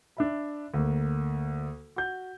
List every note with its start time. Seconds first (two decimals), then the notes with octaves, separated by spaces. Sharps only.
0.17 D4 E5 B5
0.74 D2 A#3
1.96 F#4 G6